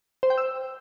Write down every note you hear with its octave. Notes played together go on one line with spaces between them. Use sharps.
C5
G5
E6